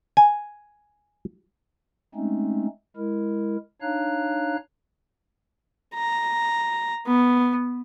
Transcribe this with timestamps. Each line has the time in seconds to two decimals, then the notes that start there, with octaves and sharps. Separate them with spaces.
0.17 G#5
2.15 G#3 A3 C4 C#4 D#4
2.97 G#3 E4 A#4
3.82 D4 D#4 C#5 F5 A#5 F#6
5.95 A#5
7.07 B3